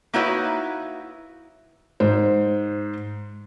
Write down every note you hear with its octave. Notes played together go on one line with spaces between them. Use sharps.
A#3 D#4 E4 F#4 B4 C#5
G#2 C5